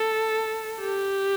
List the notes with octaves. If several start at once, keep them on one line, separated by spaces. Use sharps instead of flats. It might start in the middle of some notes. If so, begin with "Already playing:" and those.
Already playing: A4
G4